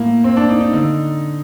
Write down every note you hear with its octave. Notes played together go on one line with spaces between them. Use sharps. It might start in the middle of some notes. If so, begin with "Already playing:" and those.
Already playing: A2 A#3
C4
D4
D#4
D#4
D3 D#4